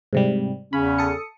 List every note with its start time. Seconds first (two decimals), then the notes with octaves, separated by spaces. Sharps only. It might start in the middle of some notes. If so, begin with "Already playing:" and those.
0.13 G#2 C3 G3
0.73 E2 C#3 C#4 B5
0.98 A4 D#6 C#7